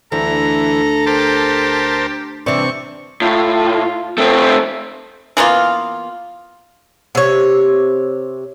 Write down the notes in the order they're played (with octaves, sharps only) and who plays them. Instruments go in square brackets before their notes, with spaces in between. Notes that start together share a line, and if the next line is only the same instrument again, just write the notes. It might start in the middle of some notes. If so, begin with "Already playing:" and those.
[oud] D2 [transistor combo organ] E3 [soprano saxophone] A4 [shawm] A#5
[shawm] G4 [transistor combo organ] A#4 C5 A5
[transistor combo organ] C3 [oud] E3 D4 [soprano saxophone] D5 [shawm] C#6
[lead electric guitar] A2 [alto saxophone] F4
[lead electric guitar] A3 C4
[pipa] E3 A#3 B3 F4
[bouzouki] C3 C#5